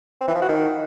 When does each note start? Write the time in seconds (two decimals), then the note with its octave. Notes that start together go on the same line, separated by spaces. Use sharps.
0.21 C4
0.28 E3
0.35 F3
0.42 F#4
0.49 D#3